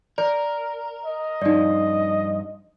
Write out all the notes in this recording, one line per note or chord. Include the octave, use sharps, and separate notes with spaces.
A#4 D5
D#5
G2 F3 D#4 D5